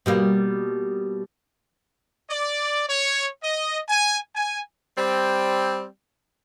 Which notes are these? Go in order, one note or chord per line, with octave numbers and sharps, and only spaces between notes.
B2 G3 A#3
D5
C#5
D#5
G#5
G#5
G3 C4